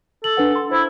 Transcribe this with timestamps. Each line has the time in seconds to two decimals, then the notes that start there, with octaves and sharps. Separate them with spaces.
0.24 A4 F#7
0.37 D4 B4 F#5
0.56 C6
0.71 E4 C5